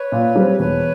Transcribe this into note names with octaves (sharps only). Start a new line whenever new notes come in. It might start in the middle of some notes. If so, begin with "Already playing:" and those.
Already playing: B4 C#5
A#2
G3 C4
E1 B4 C#5